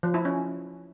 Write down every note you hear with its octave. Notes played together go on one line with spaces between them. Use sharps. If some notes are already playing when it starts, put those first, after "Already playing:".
F3
E4
C#4